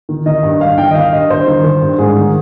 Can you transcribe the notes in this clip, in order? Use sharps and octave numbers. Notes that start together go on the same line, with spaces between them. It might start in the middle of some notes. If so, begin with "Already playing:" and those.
D#3
D#3 D#5
G2
G2 F5
D#3 G5
D#5
D#3 F5
G2 D#5
G2 C5
D#3
D#3
G2
G#2 G#4
D#3